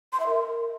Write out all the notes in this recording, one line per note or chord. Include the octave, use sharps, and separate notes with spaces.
C6
E5
A#4